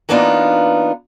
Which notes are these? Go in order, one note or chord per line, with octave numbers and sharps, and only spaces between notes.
E3 A#3 B3 D4 D#4 F4